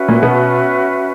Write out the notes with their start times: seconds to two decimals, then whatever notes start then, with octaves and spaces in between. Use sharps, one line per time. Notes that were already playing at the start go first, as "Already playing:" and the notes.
Already playing: C#4 F#4 B4 E5
0.08 A#2 A#3
0.22 B2 B3